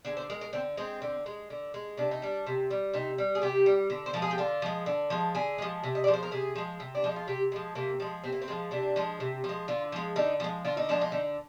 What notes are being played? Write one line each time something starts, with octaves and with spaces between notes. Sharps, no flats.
D3 G#4
C5
G#3 A#4
A#4
D3 C4
G#3 C4
D3
G#3
D3
G#3
C3 D4
D#4
G3 D4
C3
G3
C3 D#4
G3
G#4
C3 G4
G3
D3
C5
F3 G#3 A#4
G#4
G4
D3 F4
F3 G#3
D3
F3 G#3
D3 G#4
F3 G#3
C3
D#5
F3 G#3 D5
C5
A#4
C3 G#4
F3 G#3
C3
D4
F3 G#3 D#4
F4
C3 G4
F3 G#3
C3 A#3
F3 G#3
C3 C4
A#3
C4
F3 G#3
C3 D4
F3 G#3
C3
F3
G#3
D3 F4
F3 G#3
D3 D#4
F3 G#3
D3 F4
D#4
F3 G#3 D4
D#4
D3